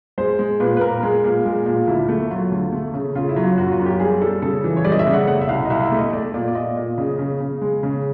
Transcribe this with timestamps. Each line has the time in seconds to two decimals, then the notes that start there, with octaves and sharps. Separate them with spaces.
0.18 G#3 C5
0.39 G#3
0.60 A#2 B4
0.77 B4
0.81 A#2 A#4
1.03 G#3
1.24 A#2
1.45 G#3
1.66 A#2
1.87 D2 E4
2.09 A3
2.30 F#3 F4
2.52 D2
2.72 A3
2.94 C#3
3.15 C#3 F4
3.29 E4
3.36 F#3
3.42 F4
3.57 F#2 F#4
3.72 F4
3.79 F#2
3.86 G4
4.00 G3 G#4
4.22 G3 A4
4.42 C#3 A4
4.64 E3
4.77 C#5
4.85 G3 D5
4.92 D#5
4.99 E5
5.07 C#3
5.13 F#5
5.27 A3 F#5
5.41 E5
5.49 C2 F5
5.65 D#5
5.70 C2 E5
5.85 E5
5.92 A3
5.99 D#5
6.13 A3 D5
6.34 A#2 D5
6.48 D5
6.55 A#2 D#5
6.76 A#2
6.98 C#3
7.19 C#3
7.40 C#3
7.62 G#3
7.83 C#3